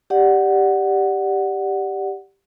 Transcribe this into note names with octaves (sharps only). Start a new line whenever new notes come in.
G4 D5 F#5